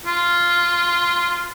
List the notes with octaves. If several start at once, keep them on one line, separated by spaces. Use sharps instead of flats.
F4